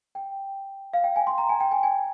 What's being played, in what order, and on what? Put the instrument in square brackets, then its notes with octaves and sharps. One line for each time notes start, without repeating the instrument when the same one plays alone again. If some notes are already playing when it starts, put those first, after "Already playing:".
[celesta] G5
F5
G5
G#5
C6
A#5
G#5
G5
G#5
G#5